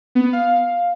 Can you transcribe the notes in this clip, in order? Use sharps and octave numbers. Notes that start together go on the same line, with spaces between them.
B3
F5